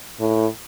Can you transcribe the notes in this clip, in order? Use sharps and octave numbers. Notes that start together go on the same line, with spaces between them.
A2